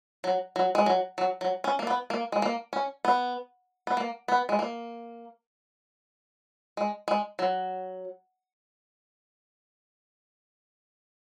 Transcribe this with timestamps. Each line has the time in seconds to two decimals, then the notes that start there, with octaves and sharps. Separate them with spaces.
0.24 F#3
0.56 F#3
0.75 G#3
0.86 F#3
1.18 F#3
1.41 F#3
1.64 C#4
1.79 A#3
1.87 B3
2.10 A#3
2.32 G#3
2.42 A#3
2.73 C#4
3.05 B3
3.87 B3
3.97 A#3
4.28 B3
4.49 G#3
4.59 A#3
6.77 G#3
7.08 G#3
7.39 F#3